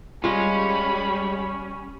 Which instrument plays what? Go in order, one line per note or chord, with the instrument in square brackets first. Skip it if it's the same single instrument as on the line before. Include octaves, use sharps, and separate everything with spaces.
[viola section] G3 [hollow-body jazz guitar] G#3 F4 [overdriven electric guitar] C#4 [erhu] B5